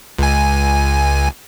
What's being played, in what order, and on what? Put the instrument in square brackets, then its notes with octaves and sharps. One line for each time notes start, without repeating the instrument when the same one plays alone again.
[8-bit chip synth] C#2 G#5